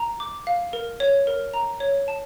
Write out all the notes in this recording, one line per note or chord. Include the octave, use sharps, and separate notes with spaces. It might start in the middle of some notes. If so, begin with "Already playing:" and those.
Already playing: A#5
D6
F5
A#4
C#5
A#4
A#5
C#5
A5